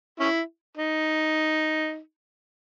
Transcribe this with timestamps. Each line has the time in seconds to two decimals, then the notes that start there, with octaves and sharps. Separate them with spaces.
0.20 C#4 E4
0.77 D#4